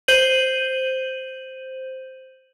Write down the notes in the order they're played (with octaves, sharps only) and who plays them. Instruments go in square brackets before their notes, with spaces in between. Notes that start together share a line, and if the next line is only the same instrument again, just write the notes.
[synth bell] C5 G6 D#7 F#7